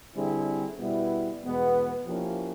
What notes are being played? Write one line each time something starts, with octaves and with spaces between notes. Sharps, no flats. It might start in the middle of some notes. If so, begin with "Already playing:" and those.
D3 G3 C4 E4 G#4
B2 G3 B3 E4
E2 B2 G#3 B3
F3 A#3 C#4 E4 G4